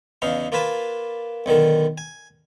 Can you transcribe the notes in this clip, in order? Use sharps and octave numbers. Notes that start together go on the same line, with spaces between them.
E2 C#3 D#4 F5
A#3 F4 A#4 B4 G#5 A5
B1 D3 D#3 A#4
G#5